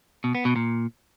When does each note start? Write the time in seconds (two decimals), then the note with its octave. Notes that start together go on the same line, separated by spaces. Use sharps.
0.24 B2
0.35 B3
0.45 B2
0.56 A#2